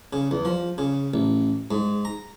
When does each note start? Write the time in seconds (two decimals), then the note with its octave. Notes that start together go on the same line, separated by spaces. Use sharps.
0.13 C#3
0.31 E2
0.45 F3
0.78 C#3
1.14 A1
1.71 G#2
2.05 A#5